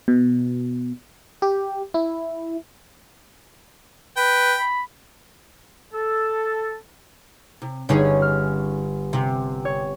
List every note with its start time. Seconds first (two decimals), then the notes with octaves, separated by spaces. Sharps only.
0.08 B2
1.42 G4
1.94 E4
4.17 B4 G5
4.58 B5
5.93 A4
7.62 C3
7.89 G1 C#4 D#4 G#4
8.22 F6
9.13 C3
9.65 C#5